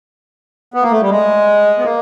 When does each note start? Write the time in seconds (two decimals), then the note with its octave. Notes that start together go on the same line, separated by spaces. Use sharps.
0.74 B3
0.83 A#3
0.92 A3
1.01 G3
1.10 G#3
1.79 B3
1.84 A#3